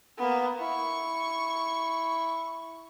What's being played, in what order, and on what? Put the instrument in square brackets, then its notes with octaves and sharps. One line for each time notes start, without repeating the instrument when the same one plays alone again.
[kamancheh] A#3 B3
[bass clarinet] E4 [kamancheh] C#6